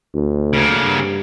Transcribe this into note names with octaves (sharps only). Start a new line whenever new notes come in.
D2
C#3 A#3
G2